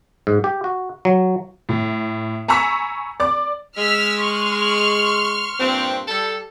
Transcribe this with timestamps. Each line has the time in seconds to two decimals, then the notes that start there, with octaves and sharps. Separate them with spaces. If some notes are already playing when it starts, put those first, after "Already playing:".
0.27 G#2
0.44 G4
0.64 F#4
1.05 F#3
1.69 A2
2.48 G#5 A#5 B5 C#6 E6 B6
3.20 D5 D6
3.77 G#3 E6 F6 B6
4.22 C6 C#6 F6
5.59 G2 A#2 C4
6.08 G3 A4